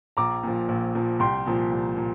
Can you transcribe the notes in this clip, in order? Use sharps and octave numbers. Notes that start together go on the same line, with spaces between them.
A#1 A#5 D6
A#2 F3
A#1
A#2 F3
C2 G5 C6
A#2 F3
C2
A#2